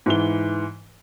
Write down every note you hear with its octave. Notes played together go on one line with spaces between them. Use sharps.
G#2 E3 G7